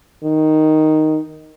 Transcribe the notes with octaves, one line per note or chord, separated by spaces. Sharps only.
D#3